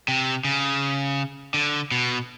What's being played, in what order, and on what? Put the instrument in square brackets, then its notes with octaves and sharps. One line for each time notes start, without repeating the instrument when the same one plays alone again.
[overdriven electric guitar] C3
C#3
D3
B2